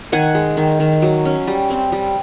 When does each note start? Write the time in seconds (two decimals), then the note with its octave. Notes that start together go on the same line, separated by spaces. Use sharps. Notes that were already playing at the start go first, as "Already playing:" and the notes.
0.12 D#3 F#5 G#5
0.35 G#3
0.57 D#3
0.80 D#3
1.02 F#3
1.25 C#4
1.47 G3
1.70 C4
1.92 G3